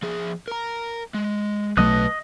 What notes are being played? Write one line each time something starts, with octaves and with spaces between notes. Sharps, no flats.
F3 G#4
A#4 A#5
G#3
B1 F#3 A3 B4 D#5 A5 D#6 F#6